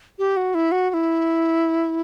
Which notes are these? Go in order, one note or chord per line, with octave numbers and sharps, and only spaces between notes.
G4
F#4
E4
F#4
F#4
E4